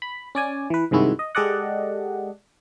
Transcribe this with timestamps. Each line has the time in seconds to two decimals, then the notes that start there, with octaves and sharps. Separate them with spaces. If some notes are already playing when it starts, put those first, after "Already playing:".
0.02 B5
0.35 C#4 D5 G#5
0.70 E3 B4
0.91 G2 C3 D#3 G#3 E4 F#4
1.19 D#5
1.35 G#3 G4 A4 D5 D#5 F#5